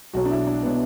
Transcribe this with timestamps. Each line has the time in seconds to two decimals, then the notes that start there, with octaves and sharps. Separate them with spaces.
0.13 B1 B2 F#3 F#4
0.26 D4
0.31 E4
0.47 D4
0.63 B2 F#3 B3